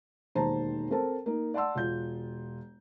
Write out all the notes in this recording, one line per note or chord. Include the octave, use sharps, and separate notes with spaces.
E1 D#2 D#3 C5 A5 A#5
C4 A4 A#4 C5 A5
A#3 D#4
D5 F#5 A5 C6 E6
E1 F4 G6